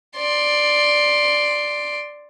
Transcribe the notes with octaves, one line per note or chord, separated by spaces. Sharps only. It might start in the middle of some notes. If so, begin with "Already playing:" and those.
D5 C6